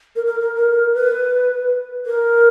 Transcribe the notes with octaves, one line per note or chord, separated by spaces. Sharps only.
A#4
A#4
A#4
A#4
A#4
B4
A#4